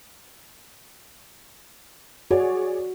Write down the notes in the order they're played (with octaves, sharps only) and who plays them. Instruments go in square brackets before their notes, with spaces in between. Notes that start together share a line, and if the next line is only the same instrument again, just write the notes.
[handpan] F#4 [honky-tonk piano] G#4 C#5 D5